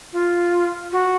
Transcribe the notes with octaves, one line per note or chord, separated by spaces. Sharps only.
F4
F#4